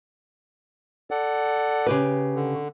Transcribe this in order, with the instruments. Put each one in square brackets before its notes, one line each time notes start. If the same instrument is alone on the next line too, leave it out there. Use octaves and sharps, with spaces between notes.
[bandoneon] A4 D5 F#5
[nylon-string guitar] C#3 G4 B4
[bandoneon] D3